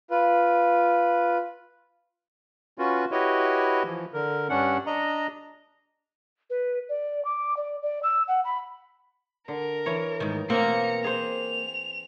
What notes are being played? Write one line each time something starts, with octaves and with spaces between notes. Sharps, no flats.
F4 B4
C#4 F4 F#4 B4
E4 F#4 G4 B4 C#5 D#5
E3 F3
D3 A#4
G2 C#4 D4 F#5
D4 D#5 A#5
B4
D5
D6
D5
D5
E6
F#5
B5
D3 A#4
E3 C#5
G#2 D#3
B2 A#3 C4 A#4 A#5 C#7
G#4 C5 F7